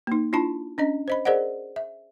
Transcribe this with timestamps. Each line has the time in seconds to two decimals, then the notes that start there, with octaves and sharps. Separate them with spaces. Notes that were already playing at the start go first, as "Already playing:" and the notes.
0.07 A#3 D#4
0.33 D4 E4 F4 A5 B5
0.78 C#4 D4 D#5
1.08 C5 D#5 B5
1.25 G#4 A#4 C5 D5 D#5 F#5
1.76 E5